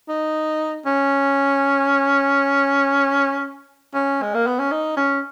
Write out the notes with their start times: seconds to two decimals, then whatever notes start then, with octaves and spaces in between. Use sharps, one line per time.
0.09 D#4
0.86 C#4
3.94 C#4
4.22 G#3
4.35 A#3
4.47 B3
4.59 C#4
4.71 D#4
4.97 C#4